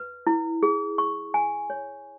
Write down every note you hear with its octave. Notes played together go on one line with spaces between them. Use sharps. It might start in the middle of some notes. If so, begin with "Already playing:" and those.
Already playing: B4
E4
G#4
C#6
G#5
C#5